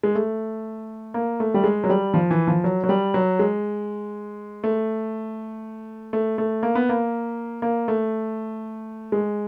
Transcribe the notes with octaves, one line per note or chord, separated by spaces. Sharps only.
G#3
A3
A#3
A3
G3
G#3
F#3
G3
F3
E3
F3
F#3
F#3
G3
F#3
G#3
A3
A3
A3
A#3
B3
A#3
A#3
A3
G#3